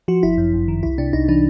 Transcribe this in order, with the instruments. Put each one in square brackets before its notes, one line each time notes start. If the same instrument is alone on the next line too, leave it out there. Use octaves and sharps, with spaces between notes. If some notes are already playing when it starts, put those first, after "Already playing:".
[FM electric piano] F3 F#4
G1 E4
F#2
G1
D#3
C2 E4
C3 D4
C2 D#4
E3 D4